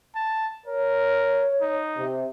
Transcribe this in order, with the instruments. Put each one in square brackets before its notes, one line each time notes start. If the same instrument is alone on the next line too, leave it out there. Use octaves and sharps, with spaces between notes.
[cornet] A5
[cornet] A#4 [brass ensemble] C#5
[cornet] D#4
[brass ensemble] C3